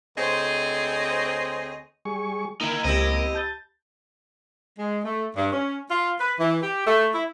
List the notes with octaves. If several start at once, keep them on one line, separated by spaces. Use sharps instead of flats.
D2 C4 G#4 C5 C#5 D#5
G3 G#4 C#6
D#3 A#3 D#4 E4
C#2 C4 E4 G4 D#5 A#6
A5 G6 A6
G#3
A3
G2
C#4
F4
B4
E3
G4
A3
E4